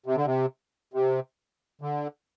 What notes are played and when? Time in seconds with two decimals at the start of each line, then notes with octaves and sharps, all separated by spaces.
0.06 C3
0.16 D3
0.26 C3
0.94 C3
1.81 D3